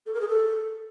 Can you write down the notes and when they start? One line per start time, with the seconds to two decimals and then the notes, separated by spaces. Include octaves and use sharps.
0.06 A4
0.13 A#4
0.21 G#4
0.28 A4